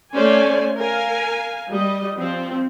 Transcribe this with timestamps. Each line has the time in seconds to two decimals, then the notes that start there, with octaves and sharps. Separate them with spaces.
0.14 A3 C#4 C5 D5 G#5
0.77 A#4 F5 G#5
1.71 G3 D#5
2.18 F3 C4